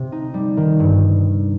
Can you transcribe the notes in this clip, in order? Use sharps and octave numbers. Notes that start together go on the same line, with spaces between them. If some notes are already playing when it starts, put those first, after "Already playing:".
Already playing: C3 C4
D#4
G3
D#3
G2